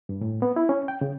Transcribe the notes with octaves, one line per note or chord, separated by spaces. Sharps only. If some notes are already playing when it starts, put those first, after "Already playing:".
G2
A2
B3
E4
C#4
G5
C#3